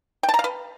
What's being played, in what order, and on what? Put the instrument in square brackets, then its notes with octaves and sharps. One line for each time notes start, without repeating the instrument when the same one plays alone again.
[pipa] G5
A5
A#5
F5
B4